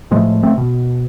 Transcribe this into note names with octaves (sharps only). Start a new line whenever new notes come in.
A2 F3 G#3 A3
C#2 A3 C4
B2